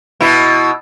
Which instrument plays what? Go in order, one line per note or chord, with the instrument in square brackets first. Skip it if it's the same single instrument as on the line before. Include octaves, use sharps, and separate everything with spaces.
[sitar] B2 E4